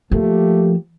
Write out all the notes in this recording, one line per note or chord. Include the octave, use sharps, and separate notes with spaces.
F3 A3 A#3 G4